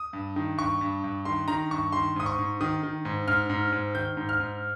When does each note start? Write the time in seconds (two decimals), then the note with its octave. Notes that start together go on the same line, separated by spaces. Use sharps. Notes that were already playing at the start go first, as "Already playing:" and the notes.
Already playing: D#6
0.13 G2
0.36 D#3
0.58 G2 C#6
0.81 G2
1.04 G2
1.25 D#3 C6
1.48 D#3 A#5
1.71 G2 C#6
1.92 D#3 C6
2.16 G#2 D#6
2.26 C#6
2.39 G#2
2.61 D#3 D#6
2.83 D#3
3.05 G#2
3.28 G#2 F6
3.50 G#2
3.72 G#2
3.95 D#3 G6
4.17 G#2
4.29 F6
4.40 G#2